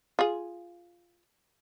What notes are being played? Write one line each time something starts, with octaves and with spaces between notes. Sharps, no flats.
F4 G#4